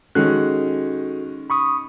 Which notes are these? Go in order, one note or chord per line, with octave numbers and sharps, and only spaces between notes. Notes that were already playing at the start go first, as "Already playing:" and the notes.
D#3 G#3 C#4 F#4 A4 F#6
B5 C#6 D#6